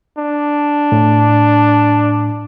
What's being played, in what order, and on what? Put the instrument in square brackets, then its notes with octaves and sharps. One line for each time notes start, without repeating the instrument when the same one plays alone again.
[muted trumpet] D4
[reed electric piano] A2